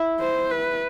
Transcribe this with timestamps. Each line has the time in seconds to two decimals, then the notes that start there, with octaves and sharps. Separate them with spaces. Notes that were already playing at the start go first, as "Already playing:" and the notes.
Already playing: E4
0.20 C5
0.51 B4